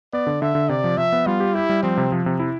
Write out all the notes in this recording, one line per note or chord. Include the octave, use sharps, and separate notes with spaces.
B3 D5
D3
D3 E5
D3
C3 D5
F3
F3 E5
B3
G3 F4
G4
E4 G4
G3
F3 C4
C3
F3
C3
E4